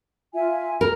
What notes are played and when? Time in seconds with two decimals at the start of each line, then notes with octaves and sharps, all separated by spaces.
0.33 F4 E5 G#5
0.81 A#4